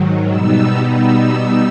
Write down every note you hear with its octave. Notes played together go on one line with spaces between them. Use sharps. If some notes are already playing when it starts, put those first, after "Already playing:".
Already playing: G#2 D#3 F#3
B2 G3 B3 D#4 E6
E6